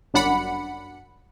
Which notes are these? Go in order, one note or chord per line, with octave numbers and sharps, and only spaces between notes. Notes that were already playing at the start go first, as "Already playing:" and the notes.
G1 F#2 D4 F#5 B5 C#7